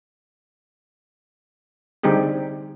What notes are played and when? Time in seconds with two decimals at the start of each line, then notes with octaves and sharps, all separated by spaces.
2.03 D3 G3 C4 D#4 G4 G#4